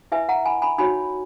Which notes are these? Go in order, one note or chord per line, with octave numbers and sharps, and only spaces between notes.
E4 B4 E5 G#5
F#5 A#5
G#5 B5
G#5 B5
D#4 F#4 C#5 G#5 B5